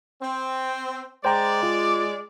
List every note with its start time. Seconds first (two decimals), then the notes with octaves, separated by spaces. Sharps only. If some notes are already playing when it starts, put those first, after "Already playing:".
0.22 C4
1.25 G#3 C5 D5 G5 A#5
1.63 F4